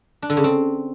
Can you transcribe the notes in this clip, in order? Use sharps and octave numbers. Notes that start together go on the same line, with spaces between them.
D4
D3
C#3
C4